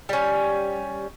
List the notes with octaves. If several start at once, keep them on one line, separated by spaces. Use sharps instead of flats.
G3 C#4